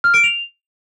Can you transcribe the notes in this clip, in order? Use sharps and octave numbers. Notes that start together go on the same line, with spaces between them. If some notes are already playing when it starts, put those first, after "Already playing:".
F6
D7
F7